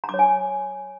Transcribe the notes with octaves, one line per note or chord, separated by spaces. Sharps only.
A#5
D6
C#5
G#5